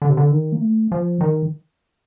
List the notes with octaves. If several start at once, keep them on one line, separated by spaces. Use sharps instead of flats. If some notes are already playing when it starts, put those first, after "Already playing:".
D3
C3
D3
D#3
A#3
A3
F3
D#3